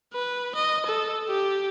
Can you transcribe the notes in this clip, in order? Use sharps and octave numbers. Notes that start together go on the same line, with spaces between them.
B4
D#5
A4
G4